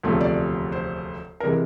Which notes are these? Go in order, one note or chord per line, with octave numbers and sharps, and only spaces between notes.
E1 D2 C3 F3 A3
D5
C5
C3 E3 G#3 A#4